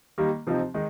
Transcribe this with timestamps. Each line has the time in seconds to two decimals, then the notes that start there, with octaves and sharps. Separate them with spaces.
0.18 D#3 G3 A#3
0.47 C3 F3 C4 D#4
0.74 D#3 G#3 D#4